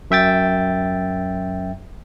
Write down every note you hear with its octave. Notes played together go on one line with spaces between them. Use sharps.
F#2 E5 G5 A6